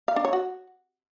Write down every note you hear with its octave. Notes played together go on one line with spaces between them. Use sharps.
F5
D4
C#5
F#4